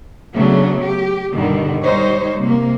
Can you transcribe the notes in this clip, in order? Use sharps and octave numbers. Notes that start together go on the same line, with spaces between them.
C#3 F#3 A3 B3 D4
G4
G2 B2 D3 D#3 G3
G3 D#4 C5 C#5
C3 A#3